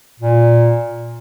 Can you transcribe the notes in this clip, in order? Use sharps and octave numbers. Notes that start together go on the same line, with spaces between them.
A#2